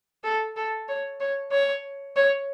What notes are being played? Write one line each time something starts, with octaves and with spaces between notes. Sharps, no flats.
A4
A4
C#5
C#5
C#5
C#5